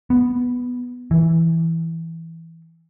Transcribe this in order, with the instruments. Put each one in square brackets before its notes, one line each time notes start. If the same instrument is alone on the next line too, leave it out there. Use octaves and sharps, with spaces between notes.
[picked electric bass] B3
E3